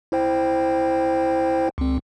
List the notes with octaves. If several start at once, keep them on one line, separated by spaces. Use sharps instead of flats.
E4 C5 G5
C#2 C4